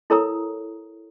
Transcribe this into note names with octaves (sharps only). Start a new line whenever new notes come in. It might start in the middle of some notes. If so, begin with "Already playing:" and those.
E4 A4 A#4 C#5 A#5 D#6